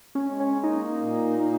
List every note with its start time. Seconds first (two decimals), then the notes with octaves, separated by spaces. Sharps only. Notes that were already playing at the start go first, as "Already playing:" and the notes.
0.15 C#4
0.27 G#3
0.40 C#4
0.64 A#3 D#4
1.01 A#2
1.38 A#3